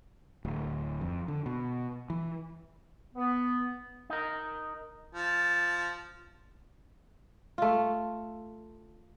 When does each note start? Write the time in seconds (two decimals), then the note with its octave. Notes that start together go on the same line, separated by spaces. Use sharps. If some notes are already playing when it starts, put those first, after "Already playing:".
0.45 D1
1.01 F2
1.28 D3
1.46 B2
2.10 E3
3.15 B3
4.10 D#4 A#4
5.14 F3 A5
7.58 A3 F4